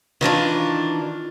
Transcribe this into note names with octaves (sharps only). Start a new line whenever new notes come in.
D#3 E3 D4 F4